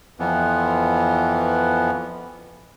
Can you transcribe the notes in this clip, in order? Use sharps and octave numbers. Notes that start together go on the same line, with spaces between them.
F2 E3 F3 B3